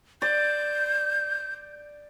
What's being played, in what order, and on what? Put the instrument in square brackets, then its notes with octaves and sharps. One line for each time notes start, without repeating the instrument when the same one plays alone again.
[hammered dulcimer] D5 [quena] G6